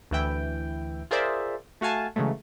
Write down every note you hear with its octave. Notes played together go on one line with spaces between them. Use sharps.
D2 E3 E4 G5
F4 G#4 A#4 C5 D5 E5
A3 F#4 F5 G#5 A5
C#3 E3 F#3 G#3 A3